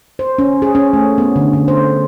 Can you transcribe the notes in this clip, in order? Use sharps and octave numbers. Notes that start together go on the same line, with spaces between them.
C5
C#4
G#4
C#4
A3
B3
D3
D3
C5